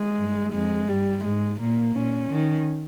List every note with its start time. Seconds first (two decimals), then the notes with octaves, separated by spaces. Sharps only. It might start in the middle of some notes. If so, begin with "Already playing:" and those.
Already playing: G#3
0.18 G2
0.53 F2 G#3
0.88 G2 G3
1.24 G#2 G#3
1.60 A#2 A#3
1.95 A#2 C#4
2.30 D#3